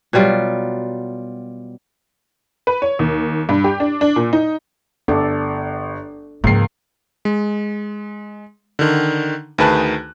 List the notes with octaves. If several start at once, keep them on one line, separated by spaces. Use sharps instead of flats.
B2 F#3 G3 F4
B4
C#5
D#2
G2
G4
D4
D4
A#2
D#4
G1 D4 A4 D5
C#2 G#2 F3 A#3 C7
G#3
D3 D#3
D2 D#3 G#4 B4 A5 F#6